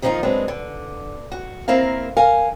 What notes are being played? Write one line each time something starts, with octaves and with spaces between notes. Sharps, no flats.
D#3 F3 A#3 B3 D#4 F4
F#3 G#3 B3 C4 D4
D3
F#4
A#3 C4 E4 A#4 F5
A#4 F5 G#5